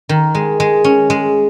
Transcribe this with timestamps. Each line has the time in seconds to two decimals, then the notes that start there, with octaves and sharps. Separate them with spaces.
0.09 D#3
0.35 G#3
0.60 G#3
0.84 C#4
1.10 G#3